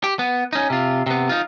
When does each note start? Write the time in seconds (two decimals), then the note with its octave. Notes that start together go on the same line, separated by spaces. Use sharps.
0.04 G4
0.19 B3
0.53 C#4 D#4
0.70 C3 F4
1.06 C3 B3
1.29 D#4 F4